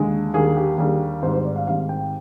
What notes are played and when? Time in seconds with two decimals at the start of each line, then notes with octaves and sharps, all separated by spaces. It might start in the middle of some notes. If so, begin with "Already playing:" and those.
Already playing: D#2 D3 G#3
0.33 D#2 D3 G3 A#3 G#4
0.57 G4
0.78 D#2 D3 G3 A#3 G#4
1.22 G#1 G#2 G3 C5
1.34 C5
1.45 D5
1.56 F5
1.67 G#1 G#2 G3 F5
1.89 G5